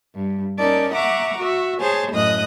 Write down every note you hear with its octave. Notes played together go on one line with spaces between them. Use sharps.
G2
C#4 D#4 A#4 D5 A5
E5 F#5 A#5 C#6 D6
F#4 E5
G#4 C5 C#5 G#5 A5
F#2 A2 D#5 D#6 F#6